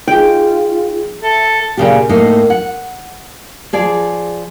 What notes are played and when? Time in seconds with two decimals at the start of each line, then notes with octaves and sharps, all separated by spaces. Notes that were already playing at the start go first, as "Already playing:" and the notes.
0.08 D#4 F4 G#4 G5
1.22 A4 E5
1.77 A#2 C#3 G4
2.09 A2 A#3 D#4
2.50 F#5
3.73 F3 G#4 D5